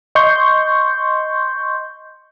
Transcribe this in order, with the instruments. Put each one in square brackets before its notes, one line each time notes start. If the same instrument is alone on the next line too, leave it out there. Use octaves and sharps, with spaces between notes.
[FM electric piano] D#5 C6 C#6 G6